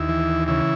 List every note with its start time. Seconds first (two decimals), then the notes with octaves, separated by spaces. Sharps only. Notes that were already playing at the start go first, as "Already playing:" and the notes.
Already playing: D#2 E4
0.09 E3
0.48 C#3 E4